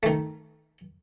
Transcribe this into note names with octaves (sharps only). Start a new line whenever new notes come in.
D#3 A3